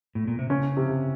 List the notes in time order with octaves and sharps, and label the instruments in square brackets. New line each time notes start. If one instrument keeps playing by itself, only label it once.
[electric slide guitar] A2
A#2
C3
[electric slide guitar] C#3 [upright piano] C#4
[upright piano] C3